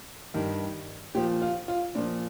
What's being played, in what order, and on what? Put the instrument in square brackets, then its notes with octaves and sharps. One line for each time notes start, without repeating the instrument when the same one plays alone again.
[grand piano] G2 D#3 G3
A#2 F3 G4
F4
F4
A#2 F3 D4